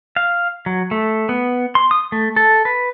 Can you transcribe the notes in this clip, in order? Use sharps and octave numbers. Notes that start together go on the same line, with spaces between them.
F5
F#3
A3
B3
C6
D#6
A3
A4
B4